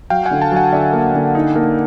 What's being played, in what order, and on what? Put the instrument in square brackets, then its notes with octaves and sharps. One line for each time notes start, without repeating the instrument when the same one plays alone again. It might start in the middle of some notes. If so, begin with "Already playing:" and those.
[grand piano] F#3 [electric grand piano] F5 G5
[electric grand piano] F#5 G#5
[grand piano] D3
[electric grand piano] G5 A5
[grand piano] F#3 [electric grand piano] F#5 G#5
[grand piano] D3 [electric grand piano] D5 E5
[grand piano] A#3
D3
D#4
A#3